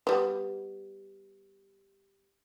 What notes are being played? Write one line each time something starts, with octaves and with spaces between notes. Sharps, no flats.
G3 B3